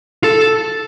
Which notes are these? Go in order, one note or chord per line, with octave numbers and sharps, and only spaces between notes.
A4